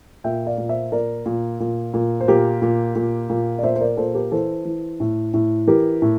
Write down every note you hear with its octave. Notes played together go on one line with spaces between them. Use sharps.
A#2 E5 G5
D5 F5
A#2
C5 E5
A#2 A#4 D5
A#2
A#2
A#2
C5
A#2 G4 A#4
A#2
A#2
A#2
D5
A#2 C5 E5
C5
A#4 D5
A#2 A4 C5
G4 A#4
E3 A4 C5
E3
A2
A2
E3 G4 A#4
A2